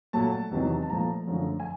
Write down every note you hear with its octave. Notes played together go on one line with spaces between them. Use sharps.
A#2 F#3 A3 A5
E2 C3 D#3 F#3
A5
A#2 F3 A3 A#5
F#2 D3 F3 A3
G#5